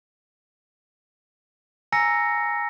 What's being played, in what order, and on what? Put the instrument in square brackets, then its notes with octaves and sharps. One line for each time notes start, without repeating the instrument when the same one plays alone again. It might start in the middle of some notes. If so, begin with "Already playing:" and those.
[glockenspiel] G#5 A#5 E6 A#6 C#7